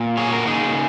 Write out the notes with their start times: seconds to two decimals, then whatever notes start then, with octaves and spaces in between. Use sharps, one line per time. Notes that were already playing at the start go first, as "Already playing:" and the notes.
Already playing: A#2
0.17 A#3 G#4 C#5
0.32 F#4 A#4
0.47 C#3 D#4 G#4